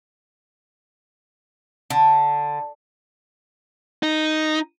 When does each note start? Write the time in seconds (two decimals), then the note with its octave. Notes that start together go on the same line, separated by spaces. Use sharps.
1.90 D3
4.03 D#4